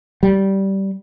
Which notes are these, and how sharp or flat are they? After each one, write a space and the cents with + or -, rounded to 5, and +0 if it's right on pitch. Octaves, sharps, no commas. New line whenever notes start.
G3 -15